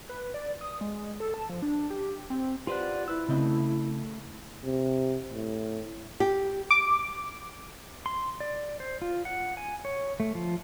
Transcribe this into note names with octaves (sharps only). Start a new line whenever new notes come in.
B4
D5
D#6
G#3
A4
A5
F3
D4
G4
C4
F4 G4 B4 C5 D5 F#5
E4 B4 E6
C#3 A3 C4 D#5
C3
A2
G4
D6
C6
D5
C5
F4
F#5
G#5
C#5
A3
F3